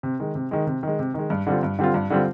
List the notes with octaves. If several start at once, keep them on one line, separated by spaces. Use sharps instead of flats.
C3
D#3 G#3
C3
D#3 G#3
C3
D#3 G#3
C3
D#3 G#3
G2
D3 G3 C4 F4
G2
D3 G3 C4 F4
G2
D3 G3 C4 F4